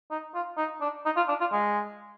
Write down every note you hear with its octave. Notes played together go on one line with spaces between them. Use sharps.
D#4
F4
D#4
D4
D#4
F4
D4
F4
G#3